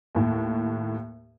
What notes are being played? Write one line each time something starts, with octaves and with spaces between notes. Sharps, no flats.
D#2 A2